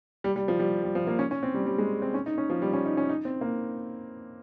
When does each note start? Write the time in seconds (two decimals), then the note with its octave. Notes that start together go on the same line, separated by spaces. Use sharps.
0.24 G3
0.36 G3
0.48 F3
0.60 G3
0.84 G3
0.95 F3
1.07 A#3
1.19 C#4
1.31 C#4
1.43 C4
1.54 G3
1.66 G3
1.78 G#3
2.02 C4
2.14 C#4
2.26 D#4
2.38 C#4
2.50 F3
2.62 G3
2.74 C#4
2.86 D#4
2.97 C#4
3.09 D#4
3.25 C4
3.41 A#3